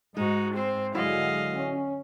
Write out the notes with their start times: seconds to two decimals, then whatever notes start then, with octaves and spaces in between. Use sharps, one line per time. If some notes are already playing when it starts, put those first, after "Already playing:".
0.17 G#2 G#3 D#4 F#4
0.54 C4 C5
0.95 D3 F#3 G#3 E4 F#4 D#5 F5
1.57 C#4